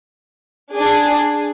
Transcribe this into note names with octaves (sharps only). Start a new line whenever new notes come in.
D4 G#4